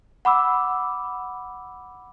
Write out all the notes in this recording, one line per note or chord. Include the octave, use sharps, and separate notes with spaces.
F#5 B5 D6 E6